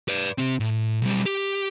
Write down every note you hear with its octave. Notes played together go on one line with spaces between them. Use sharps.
B4 D5
C3 C4
A2
B1 G3
G4